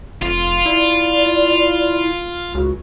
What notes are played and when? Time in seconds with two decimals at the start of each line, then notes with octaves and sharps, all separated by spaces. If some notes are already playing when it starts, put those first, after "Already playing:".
0.22 F1 F4
0.66 E4 D5
2.55 C#2 F#4